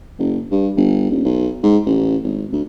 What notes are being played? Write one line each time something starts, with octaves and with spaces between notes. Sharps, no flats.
F#1
G2
G1
D#1
B1
G#2
A1
G#1
D2